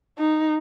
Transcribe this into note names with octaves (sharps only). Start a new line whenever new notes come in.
D#4